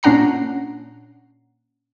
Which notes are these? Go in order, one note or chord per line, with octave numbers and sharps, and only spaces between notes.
A#2 C#4 D4 F#5 A#5 C7